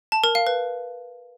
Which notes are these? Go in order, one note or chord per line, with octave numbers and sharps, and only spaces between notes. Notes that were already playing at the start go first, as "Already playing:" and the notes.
A5
A#4
F5
B4